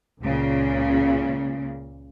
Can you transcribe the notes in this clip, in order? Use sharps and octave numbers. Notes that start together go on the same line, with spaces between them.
C#2 A#2 C#3